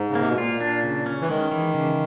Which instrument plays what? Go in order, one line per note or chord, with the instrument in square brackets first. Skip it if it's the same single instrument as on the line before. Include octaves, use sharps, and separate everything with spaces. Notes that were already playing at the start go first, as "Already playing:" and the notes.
Already playing: [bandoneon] G#2
C#3
[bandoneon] C3 [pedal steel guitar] A#3
[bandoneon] B2
[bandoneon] A#2 [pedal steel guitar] F4
[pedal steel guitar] D4
C#3
C#4
[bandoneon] E3
[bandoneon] D#3 [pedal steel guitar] G#3
[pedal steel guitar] E3
C#3